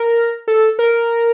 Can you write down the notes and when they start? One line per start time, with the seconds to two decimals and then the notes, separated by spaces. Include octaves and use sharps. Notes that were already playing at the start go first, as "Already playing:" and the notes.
Already playing: A#4
0.48 A4
0.79 A#4